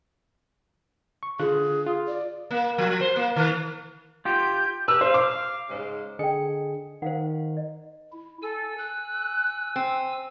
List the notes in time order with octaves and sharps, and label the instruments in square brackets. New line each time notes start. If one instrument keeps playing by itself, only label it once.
[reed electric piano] C#6
[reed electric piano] D3 F4 F#6 [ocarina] G#4
[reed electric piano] F4
[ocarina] D5
[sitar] A#3
F3
C5
A#3
D#3
[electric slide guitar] F4 G4 [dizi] G6
[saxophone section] G4 B4 [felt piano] E6
[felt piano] C5 [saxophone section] F5
[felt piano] D6
[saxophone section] G#2 C#3 C5
[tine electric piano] D3 G#4 C#7 [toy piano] D#5 G5
[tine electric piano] D#3 [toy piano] C5 F5 F#5
[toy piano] D#5
[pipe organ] E4
[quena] A4 [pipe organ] G#5 E6
[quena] F#6
[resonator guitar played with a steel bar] C4